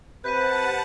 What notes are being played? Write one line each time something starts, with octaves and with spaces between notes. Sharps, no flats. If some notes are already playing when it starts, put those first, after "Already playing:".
C3 B4 F#5 A5 G6 B6 D#7